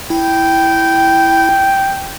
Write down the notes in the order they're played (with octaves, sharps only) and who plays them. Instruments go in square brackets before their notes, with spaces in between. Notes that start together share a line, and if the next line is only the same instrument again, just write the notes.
[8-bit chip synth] E4 [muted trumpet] G5